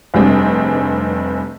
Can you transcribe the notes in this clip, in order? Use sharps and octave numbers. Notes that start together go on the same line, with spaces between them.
F1 G2 G3 C4 G#4